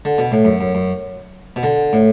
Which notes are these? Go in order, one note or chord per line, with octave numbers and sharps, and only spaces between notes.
D3
B2
A2
F#2
F#2
F#2
B2
D3
A2